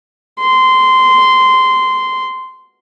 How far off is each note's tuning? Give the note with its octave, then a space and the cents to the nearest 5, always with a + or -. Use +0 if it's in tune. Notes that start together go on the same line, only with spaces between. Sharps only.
C6 -15